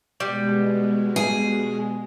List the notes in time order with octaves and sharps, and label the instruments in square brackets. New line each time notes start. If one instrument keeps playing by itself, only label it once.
[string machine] B2 G#3 [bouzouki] G3
[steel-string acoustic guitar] G#4